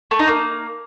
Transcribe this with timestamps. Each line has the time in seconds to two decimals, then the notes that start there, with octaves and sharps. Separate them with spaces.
0.11 A3
0.19 D#4
0.27 A#3